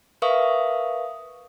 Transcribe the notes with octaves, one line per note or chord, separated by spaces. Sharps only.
A#4 B4 E5 F5 C#6 D#6